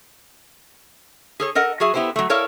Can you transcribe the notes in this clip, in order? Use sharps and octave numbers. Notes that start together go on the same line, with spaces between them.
G#4 A4 C#5
A4 A#4 D#5 F#5
F#3 F#4 G#4 E5
B3 E4 G4 A4 C5
F#3 A3
E4 A4 A#4 C#5 D5 F5